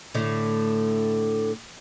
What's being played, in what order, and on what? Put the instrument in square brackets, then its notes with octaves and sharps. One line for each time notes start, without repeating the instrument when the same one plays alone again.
[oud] A2 D3